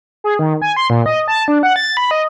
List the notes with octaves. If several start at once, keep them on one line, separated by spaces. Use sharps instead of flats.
G#4
D#3
G#5
C6
A#2
D#5
A5
D4
F#5
A6
B5
D#5